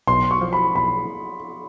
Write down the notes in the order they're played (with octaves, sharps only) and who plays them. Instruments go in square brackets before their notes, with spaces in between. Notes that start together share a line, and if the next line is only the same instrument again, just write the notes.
[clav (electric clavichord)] B1 [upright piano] C6
[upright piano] C#6
[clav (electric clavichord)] F3
[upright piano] B5
[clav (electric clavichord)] B1 [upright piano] B5